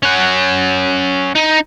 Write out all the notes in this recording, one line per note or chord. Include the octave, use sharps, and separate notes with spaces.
C#4 F#5
D#4